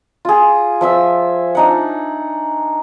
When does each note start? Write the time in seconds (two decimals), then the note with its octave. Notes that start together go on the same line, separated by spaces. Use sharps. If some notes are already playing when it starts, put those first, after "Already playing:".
0.25 F4 G#4
0.81 F3 E5 E6
1.55 D4 D#4 F#5